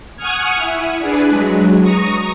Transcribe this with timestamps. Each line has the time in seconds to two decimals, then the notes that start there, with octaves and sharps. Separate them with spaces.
0.17 F#5 G#5 C#6 D#6 F6 G#6
0.57 E4
0.99 D4 G#4 B4
1.29 F#3 G#3
1.81 A#5 C#6 D#6